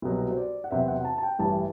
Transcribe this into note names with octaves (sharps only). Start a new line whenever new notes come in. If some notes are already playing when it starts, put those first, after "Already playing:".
C2 B2 F#3
C5
D5
F#5
E2 C3 F#3 E5
F#5
A5
A5
G5
A1 G2 E3 G3 A5